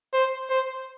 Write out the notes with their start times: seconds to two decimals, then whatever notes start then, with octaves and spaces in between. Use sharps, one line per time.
0.13 C5
0.49 C5